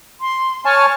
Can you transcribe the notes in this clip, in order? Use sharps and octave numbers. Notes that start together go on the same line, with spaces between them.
C6
C#5 G#5 A5 F6